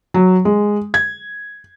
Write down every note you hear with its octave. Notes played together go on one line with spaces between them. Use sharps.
F#3
G#3
G#6